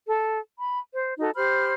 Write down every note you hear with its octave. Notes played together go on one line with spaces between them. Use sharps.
A4
B5
C5
D#4 F#4 A4
G4 C5 B5 F6